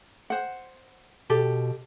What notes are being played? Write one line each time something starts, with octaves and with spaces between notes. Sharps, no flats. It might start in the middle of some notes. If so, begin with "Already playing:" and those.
C5 F#5
B2 G4 A4